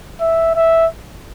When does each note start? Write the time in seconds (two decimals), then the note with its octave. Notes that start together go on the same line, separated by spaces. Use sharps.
0.20 E5
0.56 E5